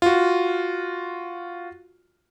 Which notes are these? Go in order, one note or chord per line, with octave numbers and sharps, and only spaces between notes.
F4 F#4